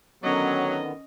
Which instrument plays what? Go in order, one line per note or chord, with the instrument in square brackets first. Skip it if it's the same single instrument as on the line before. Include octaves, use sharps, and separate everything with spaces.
[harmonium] D3 D#3 B3 [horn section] F#3 [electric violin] C#4 D#5